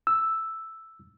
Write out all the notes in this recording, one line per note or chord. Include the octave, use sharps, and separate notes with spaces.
E6